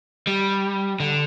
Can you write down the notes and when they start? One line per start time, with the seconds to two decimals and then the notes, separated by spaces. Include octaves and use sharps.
0.27 G3
1.00 D3